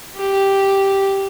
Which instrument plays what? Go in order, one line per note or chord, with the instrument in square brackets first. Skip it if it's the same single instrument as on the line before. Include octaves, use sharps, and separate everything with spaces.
[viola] G4